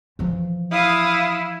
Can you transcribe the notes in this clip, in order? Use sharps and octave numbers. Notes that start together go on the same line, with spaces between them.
E3 F3
E4 F5 D#6